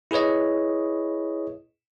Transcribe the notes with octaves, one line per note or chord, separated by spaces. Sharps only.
E4 G#4 B4 C#5 D#5